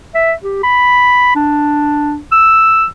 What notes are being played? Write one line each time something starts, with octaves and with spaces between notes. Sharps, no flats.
E5
G4
B5
D4
E6